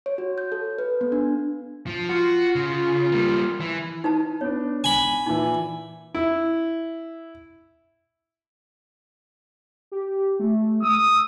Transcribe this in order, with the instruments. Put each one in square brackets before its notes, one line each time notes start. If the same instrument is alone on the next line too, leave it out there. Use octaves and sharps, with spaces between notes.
[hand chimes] C#5
F#4
G6
A4
B4
B3
D4
[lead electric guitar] F3
[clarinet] F4 [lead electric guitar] F#4
[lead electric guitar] C#3
[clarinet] F4
[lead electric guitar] G3 A#3
E3
[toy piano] D#4 B4 A5
[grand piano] B3 D4 [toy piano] C#5
[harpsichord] G#5 B5
[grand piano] A#2 E3 [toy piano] D#4
[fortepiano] E4
[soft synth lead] G4
A3
[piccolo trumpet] D#6 [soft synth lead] E6